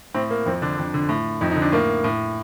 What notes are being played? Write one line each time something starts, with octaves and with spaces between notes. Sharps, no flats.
A2 C4
A#3
F2 C4
D3 D4
F2
D3
A2
F2 D#4
D#4
D3
D4
A2 A#3
A2